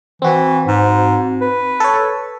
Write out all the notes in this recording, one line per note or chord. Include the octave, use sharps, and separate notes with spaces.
E3 C4 F#4
G#2
B4
A4 C#5